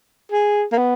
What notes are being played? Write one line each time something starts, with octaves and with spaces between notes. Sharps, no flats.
G#4
A#3
B3